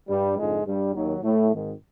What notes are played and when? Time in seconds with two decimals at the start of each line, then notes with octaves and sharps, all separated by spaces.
0.09 G2 G3
0.37 F2 G#2 D3 F3 G#3
0.66 G2 G3
0.94 D#2 D#3 F#3
1.23 A2 A3
1.52 G#1 G#2 D#3